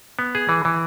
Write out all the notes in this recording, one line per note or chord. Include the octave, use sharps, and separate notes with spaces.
B3
G#4
E3
E3